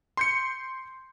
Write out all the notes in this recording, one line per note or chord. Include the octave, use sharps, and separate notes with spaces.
C6 G6 C#7